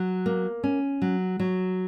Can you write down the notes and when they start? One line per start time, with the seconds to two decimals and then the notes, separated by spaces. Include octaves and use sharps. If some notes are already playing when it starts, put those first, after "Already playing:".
Already playing: F#3
0.26 A#3
0.64 C#4
1.02 F#3
1.40 F#3